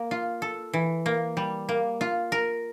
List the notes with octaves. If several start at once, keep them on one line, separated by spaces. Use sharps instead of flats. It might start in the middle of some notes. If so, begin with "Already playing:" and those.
Already playing: A#3
F4
A4
E3
A#3
G3
A#3
F4
A#4